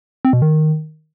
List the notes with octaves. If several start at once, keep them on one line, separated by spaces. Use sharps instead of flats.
C4
B2
D#3